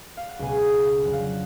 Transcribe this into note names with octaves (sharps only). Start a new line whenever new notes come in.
F5
F#5
C#2 B2 G#3 B3 G#5
F2 D3 F#3 F#5
F5
F#5